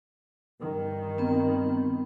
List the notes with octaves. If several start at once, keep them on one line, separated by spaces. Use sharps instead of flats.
G2 D#3
B3 C4